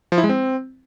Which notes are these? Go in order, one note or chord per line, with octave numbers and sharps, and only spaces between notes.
F3
E4
G#3
C4